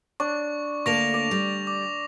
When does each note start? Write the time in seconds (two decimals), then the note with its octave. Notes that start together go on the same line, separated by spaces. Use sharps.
0.20 D4 C#6
0.86 D2 A#3 A4 C#6 A#6 F7
1.14 D5
1.31 G3
1.67 D6